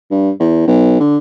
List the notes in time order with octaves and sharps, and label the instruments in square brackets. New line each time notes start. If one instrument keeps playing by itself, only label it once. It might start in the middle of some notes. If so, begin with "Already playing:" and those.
[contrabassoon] G2
E2
B1
D3